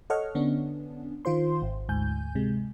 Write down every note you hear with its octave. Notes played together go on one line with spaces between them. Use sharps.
A4 C#5 D#5 F#5 C#6 F6
D3 B3 C#4 D4
D#3 F4 C5 C6
G#1
D2 G#2 G#5 G6
C3 G#3